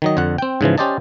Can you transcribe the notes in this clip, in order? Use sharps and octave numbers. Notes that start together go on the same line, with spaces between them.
D#3 F#3 D#5
F2 D3 F#5
C4 G5
G#2 C#3 E3 F3
C#4 G4 C5 D5 D#5 A5